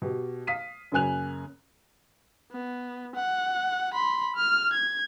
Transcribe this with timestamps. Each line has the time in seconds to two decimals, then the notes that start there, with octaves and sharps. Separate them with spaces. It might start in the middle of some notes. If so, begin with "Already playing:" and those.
0.02 B2 G4
0.47 F5 D#6 B6 D#7
0.92 F#2 C#3 A#3 G#5 F#6 F7
2.52 B3
3.15 F#5
3.94 B5 C6
4.36 F6
4.73 G#6